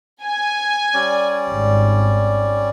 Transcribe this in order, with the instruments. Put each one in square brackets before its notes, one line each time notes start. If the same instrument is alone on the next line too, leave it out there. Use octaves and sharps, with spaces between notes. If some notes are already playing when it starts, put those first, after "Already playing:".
[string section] G#5
[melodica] G3 C#4 D5
[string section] G#1